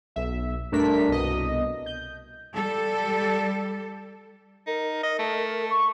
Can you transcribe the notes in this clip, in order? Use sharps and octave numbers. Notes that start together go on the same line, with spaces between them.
B1 E5
G2 A3 D4 A#4 B6
C2 B2 D#5
G6
G3 A4
D#4 A#4
D#5
A3
C#6